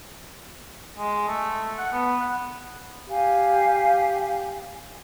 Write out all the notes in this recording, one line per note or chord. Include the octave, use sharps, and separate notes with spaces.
G#3
A3
F#5
B3
F#5
G4 F5 G#5